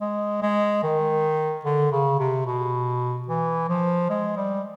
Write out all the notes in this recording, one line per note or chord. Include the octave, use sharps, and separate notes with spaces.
G#3
G#3
D#3
D3
C#3
C3
B2
E3
F3
G#3
G3